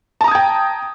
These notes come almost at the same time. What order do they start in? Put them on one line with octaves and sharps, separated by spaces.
A5 A#5 D#6 G#6 G5